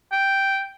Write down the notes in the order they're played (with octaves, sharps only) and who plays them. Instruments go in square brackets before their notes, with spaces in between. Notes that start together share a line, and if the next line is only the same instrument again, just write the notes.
[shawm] G5